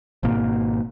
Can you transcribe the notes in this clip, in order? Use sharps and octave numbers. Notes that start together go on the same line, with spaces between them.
G#1 G#2 B2 A#3